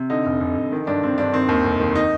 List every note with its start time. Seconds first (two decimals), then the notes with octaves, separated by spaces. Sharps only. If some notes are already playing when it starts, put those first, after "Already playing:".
Already playing: C3
0.10 D3 D#4
0.25 F1
0.40 F1
0.57 F1
0.72 D#3
0.87 G2 D4
1.03 G2 C4
1.18 G2 D4
1.33 D#3 C4
1.49 D#2
1.64 F1
1.80 D#3
1.95 D#4